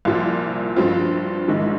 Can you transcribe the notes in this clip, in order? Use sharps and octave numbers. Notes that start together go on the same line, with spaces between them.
C2 A#2 F3
G2 F3 C4 F4
A#1 G#2 D#3